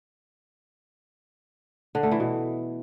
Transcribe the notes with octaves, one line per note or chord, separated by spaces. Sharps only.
D3
A3
E3
B2